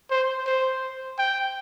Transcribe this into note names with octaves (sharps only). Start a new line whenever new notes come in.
C5
C5
G5